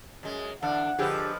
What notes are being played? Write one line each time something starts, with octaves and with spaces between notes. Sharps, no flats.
F#2 G#3
D3 E3 D4 F#5
F2 D3 F3 G4 G#4 B4